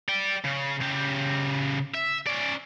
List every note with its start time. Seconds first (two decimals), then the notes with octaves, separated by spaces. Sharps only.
0.09 D5 G5
0.44 C#3
0.81 C#3 G4
1.94 E5
2.27 C#4 D5